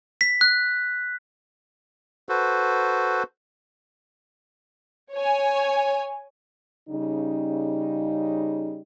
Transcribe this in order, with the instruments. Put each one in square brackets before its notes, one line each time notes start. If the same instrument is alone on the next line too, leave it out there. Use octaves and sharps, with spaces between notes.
[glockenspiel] B6
F#6
[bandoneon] F#4 A4 B4 C5
[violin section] C#5 G#5
[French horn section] C#3 G3 D#4